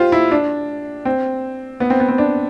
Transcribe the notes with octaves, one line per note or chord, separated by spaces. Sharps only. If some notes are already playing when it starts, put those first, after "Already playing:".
Already playing: F4 G4 C5
E4
D4
C4
B3
C4
B3
C4
D4